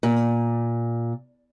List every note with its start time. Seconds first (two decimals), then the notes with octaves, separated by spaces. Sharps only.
0.03 A#2